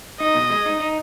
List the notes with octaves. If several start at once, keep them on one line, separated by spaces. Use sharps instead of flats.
D#4 D#5
B2
G#3
D#4
D#4